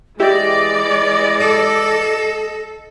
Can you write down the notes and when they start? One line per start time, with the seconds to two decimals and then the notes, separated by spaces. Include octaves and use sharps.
0.20 E3 G#3 E4 G4 D5 D#5
1.40 A4